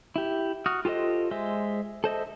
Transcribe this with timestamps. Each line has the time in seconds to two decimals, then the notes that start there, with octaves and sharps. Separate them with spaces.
0.16 E4 G4
0.66 F#4 D#6 F6
0.85 F4 G4 A4 C5 D#5
1.31 G#3 C5 E5
2.04 A4 C5 D#5 E5